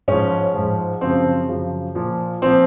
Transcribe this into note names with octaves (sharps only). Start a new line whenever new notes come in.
G#2 F3 C#4
G#2 F3
F#2 C#3 F3 C4
F#2 C#3 F3
A#2 F3
A#2 F3 C4